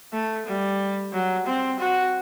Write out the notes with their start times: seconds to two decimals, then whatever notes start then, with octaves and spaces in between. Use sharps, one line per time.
0.13 A3
0.46 G3
1.13 F#3
1.47 C4
1.80 F#4